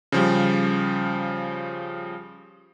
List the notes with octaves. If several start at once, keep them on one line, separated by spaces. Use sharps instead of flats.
C#3 F3 G3